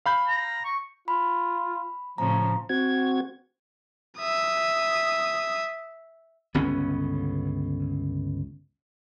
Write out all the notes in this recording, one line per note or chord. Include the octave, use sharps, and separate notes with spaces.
F5 B5 G6
A#5
C#6
F4 B5
A2 C#3 F3 A#5
C4 F#4 G#6
E5 D#6
G1 C#2 B3 C#4